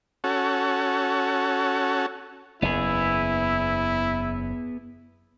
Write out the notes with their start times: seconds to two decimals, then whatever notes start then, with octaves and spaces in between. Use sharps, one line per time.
0.24 C#4 F#4 A4
2.62 F#1 E2 B3 E4 G#4